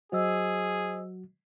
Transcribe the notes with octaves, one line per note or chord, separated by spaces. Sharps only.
F#3 F#4 G#4 C5 D#5 E6